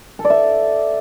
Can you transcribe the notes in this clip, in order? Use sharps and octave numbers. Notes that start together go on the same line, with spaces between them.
A4
D5
E5